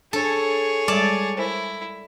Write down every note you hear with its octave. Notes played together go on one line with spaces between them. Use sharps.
D4 G#4 A4 C#5
G3 G#3 D5 A5
E4 A#4 C5 G#5